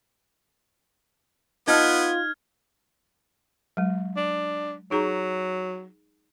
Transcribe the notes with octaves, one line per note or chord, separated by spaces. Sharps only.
B3 D#4 F4 A5 F6 G#6
F#3 G#3
D4
F#3 D#4 G#4 A#5